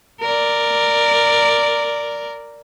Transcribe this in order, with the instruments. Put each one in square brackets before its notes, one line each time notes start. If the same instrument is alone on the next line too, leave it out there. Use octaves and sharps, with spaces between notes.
[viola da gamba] A#4 D5